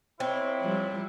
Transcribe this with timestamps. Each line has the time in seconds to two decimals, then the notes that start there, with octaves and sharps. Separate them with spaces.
0.20 A#2 G#3 C4 E4 C#5
0.61 F3 G3